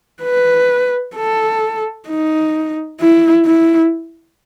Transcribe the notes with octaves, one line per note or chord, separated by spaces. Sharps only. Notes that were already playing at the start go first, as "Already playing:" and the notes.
B4
A4
D#4
E4
E4